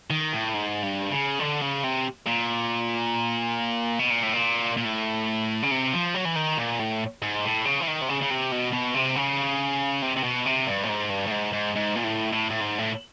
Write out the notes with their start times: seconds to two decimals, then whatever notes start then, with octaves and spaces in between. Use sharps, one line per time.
0.10 D#3
0.33 A2
0.54 G#2
0.83 G2
1.12 C#3
1.40 D3
1.62 C#3
1.83 C3
2.26 A#2
3.99 B2
4.10 A#2
4.23 A2
4.34 A#2
4.77 A#2
4.85 A2
5.63 C#3
5.71 C3
5.93 F3
6.15 F#3
6.25 E3
6.36 D#3
6.58 A#2
6.79 A2
7.22 G#2
7.44 A2
7.65 C#3
7.80 E3
7.87 D#3
8.01 C3
8.08 C#3
8.21 C#3
8.30 C3
8.51 B2
8.73 B2
8.95 C3
9.16 C#3
10.02 C3
10.17 C3
10.24 B2
10.46 C3
10.67 G2
10.83 A2
10.89 G#2
11.10 G2
11.27 A2
11.31 G#2
11.53 G#2
11.75 G#2
11.96 A#2
12.04 A2
12.33 A2
12.50 A2
12.61 G#2
12.78 A2